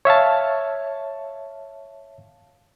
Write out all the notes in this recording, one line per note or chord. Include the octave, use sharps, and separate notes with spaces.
C#5 E5 F5 A5